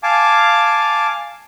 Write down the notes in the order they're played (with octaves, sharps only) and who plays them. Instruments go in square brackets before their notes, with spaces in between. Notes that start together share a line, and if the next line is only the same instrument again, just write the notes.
[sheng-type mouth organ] F5 G#5 A5 D6